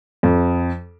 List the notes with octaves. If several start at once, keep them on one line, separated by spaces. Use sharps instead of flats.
F2